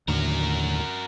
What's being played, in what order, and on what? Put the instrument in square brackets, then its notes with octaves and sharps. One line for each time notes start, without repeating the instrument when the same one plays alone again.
[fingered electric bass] D#2 A2 D3 [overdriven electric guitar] F#4 A#4